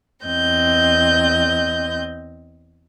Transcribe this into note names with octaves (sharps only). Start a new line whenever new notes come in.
E2 C4 D#5 G6